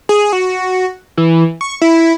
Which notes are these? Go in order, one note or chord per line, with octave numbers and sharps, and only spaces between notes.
G#4
F#4
E3
C#6
E4